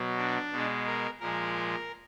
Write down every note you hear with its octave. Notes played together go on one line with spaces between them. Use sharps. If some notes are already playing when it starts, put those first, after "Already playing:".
Already playing: B2 F#3
D4
B2 G#3
A#4
A#2 F3 G#3 A#4